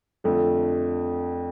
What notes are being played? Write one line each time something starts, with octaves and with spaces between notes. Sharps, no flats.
F2 D3 A3